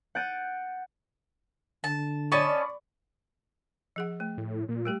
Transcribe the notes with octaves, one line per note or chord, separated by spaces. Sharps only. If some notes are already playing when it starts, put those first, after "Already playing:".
F#5 G6 A6 D7 D#7
D3 A5
C#4 D5 D#5 A5 B5 C#6
F3 G#4 F#5
A3
A2
A#2
G3 A3 G4